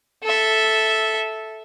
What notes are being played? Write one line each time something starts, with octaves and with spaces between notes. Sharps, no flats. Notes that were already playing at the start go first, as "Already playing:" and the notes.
A4 E5